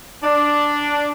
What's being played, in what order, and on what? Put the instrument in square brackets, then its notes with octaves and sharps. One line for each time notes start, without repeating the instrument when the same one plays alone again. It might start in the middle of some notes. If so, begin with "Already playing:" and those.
[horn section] D4